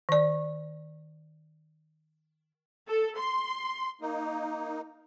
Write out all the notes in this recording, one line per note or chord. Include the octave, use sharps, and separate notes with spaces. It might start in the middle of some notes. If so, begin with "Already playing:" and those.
D#3 D5
A4
C6
A#3 D#4